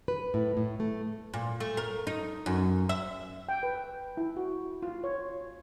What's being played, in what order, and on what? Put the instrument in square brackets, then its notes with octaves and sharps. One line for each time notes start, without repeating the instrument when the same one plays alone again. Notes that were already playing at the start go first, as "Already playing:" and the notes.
[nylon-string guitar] B4
A2
A2
A3
[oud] A#2
A3
A#4
D#4
F#2
E5
[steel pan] G5
B4
E4
F#4
F4
C#5